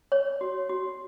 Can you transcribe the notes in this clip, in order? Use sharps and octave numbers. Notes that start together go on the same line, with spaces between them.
C#5
F#4
F#4